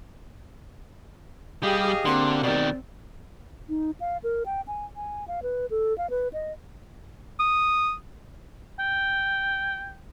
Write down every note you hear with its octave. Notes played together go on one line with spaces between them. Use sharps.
G3 G4 G#4 D#5 F5
D3 A#3 C4 G4 C6
B2 D#3 D5
D#4
F5
A#4
G5
G#5
G#5
F5
B4
A4
F5
B4
D#5
D#6
G5